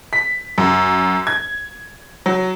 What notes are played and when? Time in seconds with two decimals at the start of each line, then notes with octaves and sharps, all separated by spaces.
0.13 B6
0.58 F#2
1.27 G#6
2.26 F#3